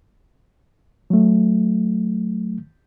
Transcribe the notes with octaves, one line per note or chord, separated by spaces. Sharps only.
F#3 A3